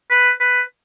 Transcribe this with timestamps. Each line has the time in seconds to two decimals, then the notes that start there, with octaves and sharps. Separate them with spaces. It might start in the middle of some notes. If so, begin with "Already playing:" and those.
0.11 B4
0.41 B4